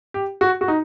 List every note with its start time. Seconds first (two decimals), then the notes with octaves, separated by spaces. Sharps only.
0.14 G4
0.41 F#4
0.61 F#4
0.68 D#4